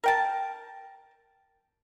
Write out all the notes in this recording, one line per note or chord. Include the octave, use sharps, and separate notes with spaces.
A#4 G5 A5